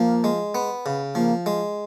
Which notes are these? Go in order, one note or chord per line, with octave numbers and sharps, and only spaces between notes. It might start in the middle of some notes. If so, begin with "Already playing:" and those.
Already playing: F3 A#3
G#3
B3
C#3
F3 A#3
G#3